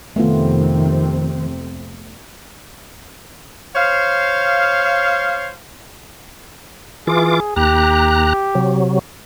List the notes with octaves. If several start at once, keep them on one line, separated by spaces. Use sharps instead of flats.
F2 C3 D#3 A3 B3 C4 F4
C5 C#5 F5
E3 F4 G#4 D6
D#2 G4 A#5 F#6
C3 F#3